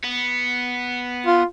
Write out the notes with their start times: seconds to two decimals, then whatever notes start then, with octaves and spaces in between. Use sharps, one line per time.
0.04 B3
1.27 F4